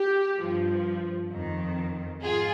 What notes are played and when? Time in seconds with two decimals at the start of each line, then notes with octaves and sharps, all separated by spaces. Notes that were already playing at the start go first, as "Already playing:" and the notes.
Already playing: G4
0.40 G2 F3
1.32 F2 D#3
2.22 G#2 F4 G#4